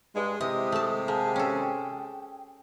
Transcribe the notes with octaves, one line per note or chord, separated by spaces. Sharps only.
G2 G#3
C3 G#3 E4 G4 D#5 D#6
A3 A5
A#3 G#4 A5
C#4 A4 G5